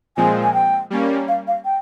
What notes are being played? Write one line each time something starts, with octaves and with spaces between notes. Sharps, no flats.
A#2 F3 G#3 C4 G#5
G#5
G5
G3 A#3 C#4
F5
F5
G5